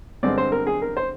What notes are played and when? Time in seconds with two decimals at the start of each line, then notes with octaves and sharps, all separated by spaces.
0.23 G2 D3 G#3 C4 D5
0.38 C5
0.52 A#4
0.67 G#4
0.82 A#4
0.97 C5